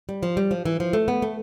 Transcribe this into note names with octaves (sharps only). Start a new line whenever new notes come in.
G3
F3
G3
F3
E3
F3
A3
B3
A3